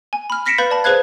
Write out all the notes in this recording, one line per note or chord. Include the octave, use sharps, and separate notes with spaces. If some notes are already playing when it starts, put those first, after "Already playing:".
G#5
B5 F6
F6 A#6 B6 C#7 D7 E7
B4 F5 B5 G6 A6
D5 A5 B5
G#4 B4 C5 F5 F#6 G#6